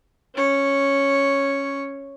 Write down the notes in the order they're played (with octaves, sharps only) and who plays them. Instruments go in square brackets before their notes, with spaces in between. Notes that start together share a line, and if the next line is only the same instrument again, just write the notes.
[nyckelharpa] C#4 C#5